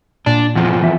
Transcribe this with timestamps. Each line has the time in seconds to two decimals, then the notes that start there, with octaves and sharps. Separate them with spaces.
0.26 A#2 D4
0.55 E2 F3
0.82 E3 E5